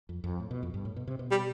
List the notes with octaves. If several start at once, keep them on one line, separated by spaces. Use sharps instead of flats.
F2
F2
A2
B2
F2
G2
A2
B2
C3
B2
G3